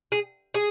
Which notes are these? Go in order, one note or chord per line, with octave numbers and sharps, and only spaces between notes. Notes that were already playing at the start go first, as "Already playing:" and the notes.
G#4
G#4